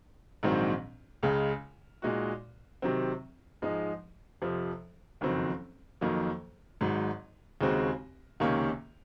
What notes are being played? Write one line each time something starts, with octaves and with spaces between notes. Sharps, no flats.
A#1 G#2 D#3 F#3 C4
C#2 C#3 G#3
A#2 G#3 D#4 F#4
C3 D#3 F#3 C4
G#2 F3 G#3 D#4
F2 C3 F3
F#1 F2 D#3 F#3 C4
F2 D#3 F#3 A#3
G#1 G#2 F#3
D#2 C#3 G#3 C4 F#4
C#2 C3 D#3 A#3 C#4